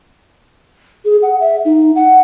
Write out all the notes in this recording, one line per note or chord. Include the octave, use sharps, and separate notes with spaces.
G#4
F#5
E5
D#4
F#5